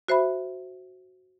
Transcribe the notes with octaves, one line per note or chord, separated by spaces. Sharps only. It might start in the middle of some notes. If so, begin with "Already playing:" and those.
F#4 C5 E5 B5